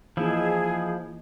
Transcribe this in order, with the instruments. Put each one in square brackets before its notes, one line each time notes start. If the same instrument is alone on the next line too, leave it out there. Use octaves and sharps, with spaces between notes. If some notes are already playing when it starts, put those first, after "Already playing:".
[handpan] E3 A#3 D#4 [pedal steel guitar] F3 E4 [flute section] G#4